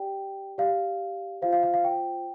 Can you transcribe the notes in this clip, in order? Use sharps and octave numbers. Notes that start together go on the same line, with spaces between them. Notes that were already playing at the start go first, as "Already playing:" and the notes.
Already playing: G4 D5 G5
G4 D5 F5
F4 C5 F5
F5
F5
F5
G5